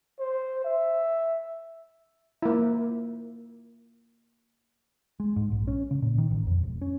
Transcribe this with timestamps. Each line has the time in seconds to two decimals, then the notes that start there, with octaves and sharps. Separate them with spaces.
0.19 C5
0.64 E5
2.42 A#3 E4
5.20 G#3
5.36 G#2
5.52 A#1
5.67 C#4
5.91 C#3
6.02 A#2
6.18 D#3
6.31 A1
6.47 F2
6.63 E1
6.81 C#4